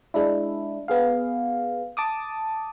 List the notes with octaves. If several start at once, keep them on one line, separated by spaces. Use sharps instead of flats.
G#3 D4 E4
B3 G#4 F5
A5 D6 D#6